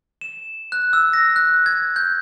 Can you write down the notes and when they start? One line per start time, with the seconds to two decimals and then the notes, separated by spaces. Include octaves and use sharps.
0.21 E7
0.72 F#6
0.93 E6
1.13 A#6
1.36 F#6
1.66 G#6
1.96 G6